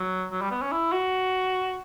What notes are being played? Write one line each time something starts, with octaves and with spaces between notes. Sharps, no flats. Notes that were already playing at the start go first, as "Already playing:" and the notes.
Already playing: F#3
F#3
G3
B3
C#4
E4
F#4